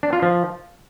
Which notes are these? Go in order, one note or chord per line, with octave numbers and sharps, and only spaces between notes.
D4
F4
F3